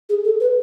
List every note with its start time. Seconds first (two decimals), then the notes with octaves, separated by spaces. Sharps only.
0.09 G#4
0.24 A4
0.40 B4